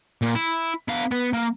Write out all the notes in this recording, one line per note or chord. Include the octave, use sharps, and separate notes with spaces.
A#2
E4
B3 F5
B3
A#3